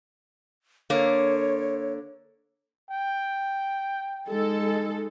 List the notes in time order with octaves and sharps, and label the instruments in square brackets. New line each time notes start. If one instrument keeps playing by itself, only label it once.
[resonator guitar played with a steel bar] D3 A#3 [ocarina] C#5
[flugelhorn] G5
[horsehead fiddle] G#3 D#4 [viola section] A4